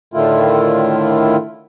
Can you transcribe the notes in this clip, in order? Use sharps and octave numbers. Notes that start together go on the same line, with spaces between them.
A2 D3 D#3 A3 E4 F4